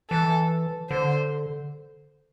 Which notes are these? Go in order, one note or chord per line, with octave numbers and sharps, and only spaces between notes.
E3 A4
D3 C5